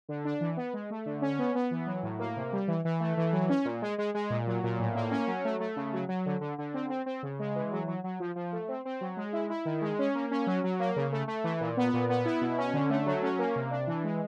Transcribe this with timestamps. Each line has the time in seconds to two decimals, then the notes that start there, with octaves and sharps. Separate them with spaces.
0.09 D3
0.25 D4
0.41 E3
0.57 B3
0.74 G#3
0.90 A3
1.06 D3
1.22 C#4
1.39 B3
1.55 B3
1.71 E3
1.87 F#3
2.03 A2
2.19 A#3
2.36 C3
2.53 G3
2.68 E3
2.85 E3
3.00 A3
3.17 E3
3.33 F#3
3.49 C#4
3.65 A#2
3.82 G#3
3.98 G#3
4.14 G#3
4.30 A#2
4.47 F#3
4.63 A#2
4.79 A2
4.95 A#3
5.11 C#4
5.27 F#3
5.45 A3
5.60 A3
5.76 C#3
5.93 F#3
6.09 F#3
6.26 D3
6.41 D3
6.58 D3
6.74 C4
6.90 C4
7.06 C4
7.23 C#3
7.39 G#3
7.55 E3
7.72 F#3
7.87 F#3
8.04 F#3
8.20 F3
8.36 F3
8.52 A3
8.68 C4
8.85 C4
9.01 F#3
9.17 G#3
9.33 E4
9.50 E4
9.65 D#3
9.82 G#3
9.99 C#4
10.15 A#3
10.31 C#4
10.47 F#3
10.64 F#3
10.80 A#3
10.96 C#3
11.12 A3
11.28 A3
11.44 E3
11.61 A#2
11.77 B3
11.93 A#2
12.09 B3
12.25 E4
12.41 B2
12.58 C#4
12.74 D3
12.90 A3
13.06 F#3
13.22 C#4
13.39 A#3
13.56 C3
13.71 D4
13.87 E3
14.04 G#3